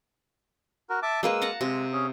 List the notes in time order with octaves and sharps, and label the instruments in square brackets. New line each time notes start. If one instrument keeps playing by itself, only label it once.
[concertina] F#4 A#4
E5 A5 D6
[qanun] G#3 A#3 B4 [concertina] E6
[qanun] F#5 A5 A#5
[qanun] C3 [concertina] G#3
[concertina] C#4 G#4